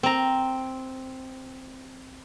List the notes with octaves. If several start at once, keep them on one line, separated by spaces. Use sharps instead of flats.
C4 A#5